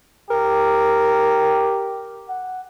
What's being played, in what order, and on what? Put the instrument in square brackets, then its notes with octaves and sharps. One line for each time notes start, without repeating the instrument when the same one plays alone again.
[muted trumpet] G4 [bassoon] A#4
[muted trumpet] F#5